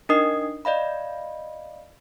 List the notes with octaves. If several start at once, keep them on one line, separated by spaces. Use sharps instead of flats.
D4 D#4 A#4 D#5 D#6 C7
D5 D#5 F5 B5